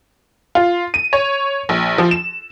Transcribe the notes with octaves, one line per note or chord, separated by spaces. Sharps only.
F4
D#7
C#5
A#1
F3
E7